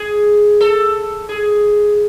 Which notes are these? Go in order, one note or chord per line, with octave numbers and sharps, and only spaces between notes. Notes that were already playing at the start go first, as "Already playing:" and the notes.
Already playing: G#4
A4
G#4